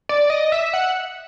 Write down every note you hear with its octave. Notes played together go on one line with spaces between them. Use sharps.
D5
D#5
E5
F#5